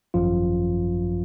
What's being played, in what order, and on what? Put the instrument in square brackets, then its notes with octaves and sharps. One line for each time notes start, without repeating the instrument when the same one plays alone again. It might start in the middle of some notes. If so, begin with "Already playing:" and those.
[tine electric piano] G#1 F#2 F3 F4